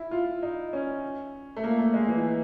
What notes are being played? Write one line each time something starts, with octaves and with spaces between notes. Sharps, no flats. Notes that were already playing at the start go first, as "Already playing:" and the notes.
Already playing: E4
F4
D#4
C#4
A3
A#3
A3
G#3
E3